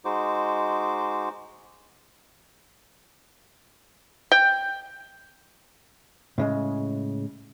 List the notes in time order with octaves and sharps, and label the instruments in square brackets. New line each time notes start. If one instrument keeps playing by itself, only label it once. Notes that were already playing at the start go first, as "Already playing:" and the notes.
[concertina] G#3 D#4 F#4 C5 D6
[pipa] G5
[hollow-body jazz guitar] A2 C#3 G#3